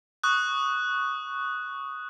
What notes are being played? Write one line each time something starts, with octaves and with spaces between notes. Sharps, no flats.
C#6 D#6 F#6